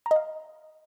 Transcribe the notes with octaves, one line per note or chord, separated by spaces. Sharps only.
A#5
D#5
F5